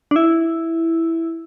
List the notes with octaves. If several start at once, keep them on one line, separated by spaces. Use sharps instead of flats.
D4
E4